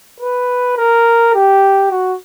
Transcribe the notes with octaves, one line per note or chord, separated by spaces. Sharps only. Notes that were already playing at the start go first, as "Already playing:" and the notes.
B4
A#4
G4
F#4